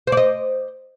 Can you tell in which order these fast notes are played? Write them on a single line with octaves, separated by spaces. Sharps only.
C5 D5 D#5